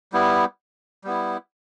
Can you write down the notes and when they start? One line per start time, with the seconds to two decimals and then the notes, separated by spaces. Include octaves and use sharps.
0.13 G3 B3 E4
1.04 G3 B3 E4